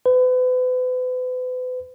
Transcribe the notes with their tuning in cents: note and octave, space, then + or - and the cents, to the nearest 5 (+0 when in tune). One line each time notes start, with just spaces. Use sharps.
B4 +40